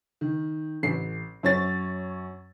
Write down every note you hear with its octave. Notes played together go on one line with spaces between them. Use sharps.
D#3
A1 C7
F#2 C#5 A6